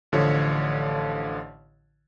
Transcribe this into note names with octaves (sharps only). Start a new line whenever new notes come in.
A1 D3 F3 C#5